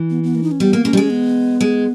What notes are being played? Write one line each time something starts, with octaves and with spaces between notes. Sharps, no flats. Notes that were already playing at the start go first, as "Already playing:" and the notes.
Already playing: E3
B3
B3
A#3
D#4
C#4
G3 B3
A#3
A#3 C#4
G3
G#3
B3
G#3